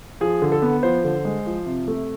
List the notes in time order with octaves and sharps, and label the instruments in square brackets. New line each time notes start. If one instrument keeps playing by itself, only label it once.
[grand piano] F3 G#4
D3
A4
B3
F3 C5
D3
G#3
F3
C3
A3